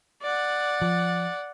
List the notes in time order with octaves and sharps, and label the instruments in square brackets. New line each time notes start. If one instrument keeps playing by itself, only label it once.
[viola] D5 F#5
[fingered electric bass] F3